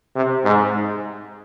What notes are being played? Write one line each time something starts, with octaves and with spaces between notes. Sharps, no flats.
C3
G#2